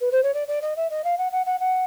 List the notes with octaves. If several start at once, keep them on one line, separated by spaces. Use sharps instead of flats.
B4
C5
C#5
D5
D5
D#5
E5
D#5
F5
F#5
F#5
F#5
F#5